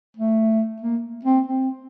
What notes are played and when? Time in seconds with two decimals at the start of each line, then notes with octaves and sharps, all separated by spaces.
0.17 A3
0.81 A#3
1.24 C4
1.46 C4